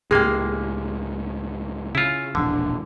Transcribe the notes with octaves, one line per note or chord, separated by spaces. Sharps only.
C#2 A2 G#3 A#3 G4 G#4
C#3 E4 F4
E1 A#1 D3 D4